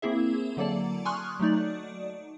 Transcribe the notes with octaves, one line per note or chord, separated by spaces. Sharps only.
A#3 C4 E4 G#4 E5
D3 F#3 A#3 A4 D5 A5
G#5 C6 C#6 D#6 F6 F#6
F#3 A3 D#4 D5